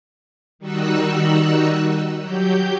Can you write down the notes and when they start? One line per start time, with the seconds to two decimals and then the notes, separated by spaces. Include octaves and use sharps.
0.59 D#3 G3 D#4 F#4 E6 F#6
2.19 F#3 G4 G6